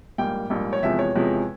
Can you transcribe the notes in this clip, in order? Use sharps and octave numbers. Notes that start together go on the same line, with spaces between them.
A#1 G#2 G3 A#3 G5
A#1 G#2 G3 A#3
C#5
E2 C3 F3 G#3 E5
C#5
E2 C3 F3 G#3